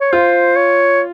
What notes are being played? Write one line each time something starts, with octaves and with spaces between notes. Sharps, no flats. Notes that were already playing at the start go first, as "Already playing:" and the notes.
C#5
F4 C5
C#5